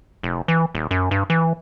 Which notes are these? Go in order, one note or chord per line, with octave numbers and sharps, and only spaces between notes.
F1
E3
D#1
F#2
G2
E3